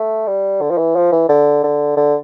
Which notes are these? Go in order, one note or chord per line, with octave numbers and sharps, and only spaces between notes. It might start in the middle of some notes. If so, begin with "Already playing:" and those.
Already playing: A3
G3
D3
F3
E3
F3
E3
D3
D3
D3